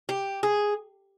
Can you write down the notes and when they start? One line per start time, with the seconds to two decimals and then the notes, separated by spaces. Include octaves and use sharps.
0.09 G4
0.43 G#4